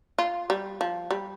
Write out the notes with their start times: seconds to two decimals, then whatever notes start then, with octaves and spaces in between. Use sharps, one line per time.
0.19 F4
0.50 G3
0.81 F3
1.11 G3